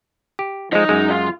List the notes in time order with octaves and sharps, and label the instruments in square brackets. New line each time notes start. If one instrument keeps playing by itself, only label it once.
[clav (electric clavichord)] G4
[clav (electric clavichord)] F3 G#3 [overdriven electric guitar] D#4 D#5
[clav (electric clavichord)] F#2 G#3
[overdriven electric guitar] F4